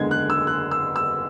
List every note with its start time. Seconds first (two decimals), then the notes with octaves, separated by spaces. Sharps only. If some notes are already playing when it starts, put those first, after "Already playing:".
Already playing: F#1 E2 D3 G#3 G#6
0.11 F#6
0.30 E6
0.47 F#6
0.71 E6
0.96 E6